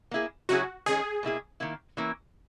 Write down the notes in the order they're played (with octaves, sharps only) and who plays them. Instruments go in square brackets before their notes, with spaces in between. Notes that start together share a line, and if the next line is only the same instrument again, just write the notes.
[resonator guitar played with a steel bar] A#3 E4 G#4
[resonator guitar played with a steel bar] C#3 F#3 C#4 E4 G#4 [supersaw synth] F#4
[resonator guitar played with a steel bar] D#3 G#3 C#4 [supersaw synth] G#4
[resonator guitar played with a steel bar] B2 A#3 E4 G#4
D#3 A#3 E4
E3 A#3 C#4 E4